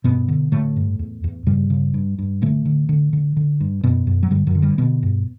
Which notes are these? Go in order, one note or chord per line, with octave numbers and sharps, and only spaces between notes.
G2 B2 B3
D3
A2 D3 A3
G2
E2
E2
G2 C#3 G3
C#3
G2
G2
A2 D3 A3
D3
D3
D3
D3
G2
F#2 B2 B3
F#2
F#3
G2 D3 G3
F#2 F#3
D3
G2 G3
B2 D3 B3
G2